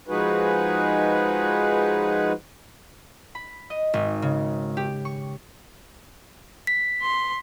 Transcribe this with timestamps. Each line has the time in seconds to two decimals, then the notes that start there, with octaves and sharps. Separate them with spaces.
0.08 F3 G#3 D#4 F#4 G#4 B4
3.35 B5
3.70 D#5
3.94 G#1
4.22 C#3
4.77 G4
5.05 C#6
6.67 B6
7.02 C6